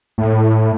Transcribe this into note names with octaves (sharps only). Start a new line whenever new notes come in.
A2